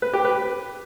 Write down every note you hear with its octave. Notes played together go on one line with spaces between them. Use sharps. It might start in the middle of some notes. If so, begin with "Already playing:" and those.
B4
G4
B4